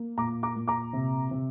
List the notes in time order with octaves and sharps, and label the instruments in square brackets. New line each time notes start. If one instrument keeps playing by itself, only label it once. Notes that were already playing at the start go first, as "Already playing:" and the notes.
Already playing: [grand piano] A#3
A#2 A#5 D6
A#5 D6
A#2
A#5 D6
C3
C3